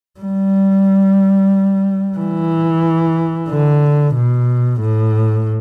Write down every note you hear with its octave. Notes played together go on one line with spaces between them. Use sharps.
G3
E3
D3
B2
A2